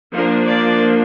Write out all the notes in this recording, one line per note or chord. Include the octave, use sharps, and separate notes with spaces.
F3 A#3 D4 A#4
D5